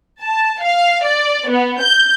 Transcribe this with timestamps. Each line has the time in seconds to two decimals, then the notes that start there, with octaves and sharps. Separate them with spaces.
0.21 A5
0.62 F5
1.04 D5
1.49 B3
1.81 G6